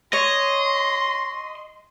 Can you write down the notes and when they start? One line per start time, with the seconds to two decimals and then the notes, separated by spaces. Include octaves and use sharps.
0.13 C#5 D#5 C6